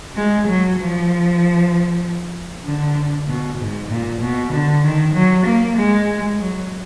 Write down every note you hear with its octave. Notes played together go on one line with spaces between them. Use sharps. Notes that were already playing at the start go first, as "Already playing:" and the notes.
G#3
F#3
F3
D3
B2
G#2
A#2
B2
D3
D#3
F#3
A#3
G#3
F#3